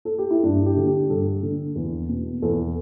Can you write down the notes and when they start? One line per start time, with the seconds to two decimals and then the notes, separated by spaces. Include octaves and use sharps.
0.05 A4
0.18 G4
0.30 E4
0.43 G2 D4
0.66 G4
0.76 D3
0.87 G4
1.09 G2 A4
1.43 D3
1.75 E2
2.09 B2
2.42 E2 A4